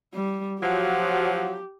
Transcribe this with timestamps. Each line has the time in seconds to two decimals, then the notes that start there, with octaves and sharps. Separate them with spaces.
0.14 G3
0.61 F3 F#3 G4